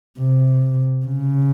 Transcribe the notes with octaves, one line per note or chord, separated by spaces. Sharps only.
C3
C#3